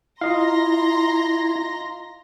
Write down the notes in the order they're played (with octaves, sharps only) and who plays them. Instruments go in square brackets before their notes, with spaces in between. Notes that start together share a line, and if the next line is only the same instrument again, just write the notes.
[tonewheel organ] E4 [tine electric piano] F4 D#5 F5 [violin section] A#5 C6 A#6